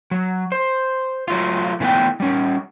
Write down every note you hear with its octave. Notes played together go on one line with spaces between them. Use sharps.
F#3
C5
F#3 A3 F4
C3 E3 A3 B3 G5
G3 C#4